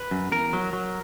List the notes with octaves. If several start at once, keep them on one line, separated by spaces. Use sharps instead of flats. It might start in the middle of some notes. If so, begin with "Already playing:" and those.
Already playing: B4
F#2
E2 A#4
F#3
F#3